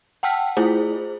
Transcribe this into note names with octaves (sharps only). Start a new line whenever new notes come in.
F#5 G5 A5 E6 F6 B6
A3 E4 F4 G#4 C5